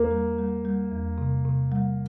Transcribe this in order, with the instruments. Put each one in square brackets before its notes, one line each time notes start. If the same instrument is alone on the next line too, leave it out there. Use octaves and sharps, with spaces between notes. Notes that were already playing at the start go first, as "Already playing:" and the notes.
Already playing: [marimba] E2 [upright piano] A#3
[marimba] G3
G3
G3
E2
C3
C3
G3